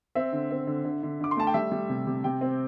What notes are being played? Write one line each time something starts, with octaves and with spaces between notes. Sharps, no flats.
C4 E5
D3
C4
D3
D3
D3
D3 D6
C6
A3 A5
G5
G3 E5
G3
C3
C3
C3 G5
C4